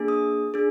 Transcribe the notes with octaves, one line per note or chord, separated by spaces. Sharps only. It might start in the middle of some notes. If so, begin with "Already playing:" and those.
Already playing: A#3 D4 G#4
D#6
D4 G#4